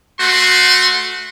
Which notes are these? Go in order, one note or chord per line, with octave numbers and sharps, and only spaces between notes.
A3 F#4 C6